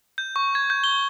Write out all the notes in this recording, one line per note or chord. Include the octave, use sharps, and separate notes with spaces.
G6
C#6
G#6
G6
G7